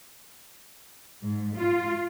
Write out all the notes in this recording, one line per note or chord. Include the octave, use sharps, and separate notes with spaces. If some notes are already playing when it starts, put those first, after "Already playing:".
G#2
F4